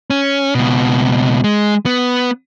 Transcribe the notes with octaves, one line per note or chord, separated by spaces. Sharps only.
C#4
C#2 B2
G#3
B3